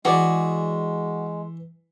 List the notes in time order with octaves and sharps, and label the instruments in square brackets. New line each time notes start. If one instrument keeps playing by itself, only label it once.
[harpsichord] E3 [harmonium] G#3 [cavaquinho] F#4 G#4 D5